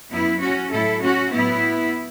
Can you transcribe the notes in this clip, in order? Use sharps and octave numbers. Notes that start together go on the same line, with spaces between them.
F#2 F#3 B3 E4
C#4 F#4
A2 F#3 E4 A4
C#4 F#4
A2 F#3 B3 E4